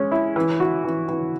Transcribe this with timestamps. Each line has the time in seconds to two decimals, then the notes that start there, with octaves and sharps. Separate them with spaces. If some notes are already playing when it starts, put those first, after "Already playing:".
Already playing: G#3 C#4
0.12 E4
0.36 E3
0.60 F#4
0.84 E3
1.08 E3